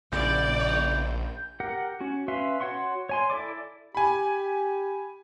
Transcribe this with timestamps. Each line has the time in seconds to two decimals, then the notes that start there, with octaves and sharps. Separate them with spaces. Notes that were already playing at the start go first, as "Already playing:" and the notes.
0.12 A#1 C#3 B3 E4 D5 G6
1.60 G4 A#4 F#5
2.01 C#4 F#4
2.28 C#4 B4 E5 F5 C6
2.60 F#4 C#5 F#5 C6 C#6
3.09 C#5 G#5 C6
3.30 E4 A4 D5 D6
3.95 G4 G#5 B5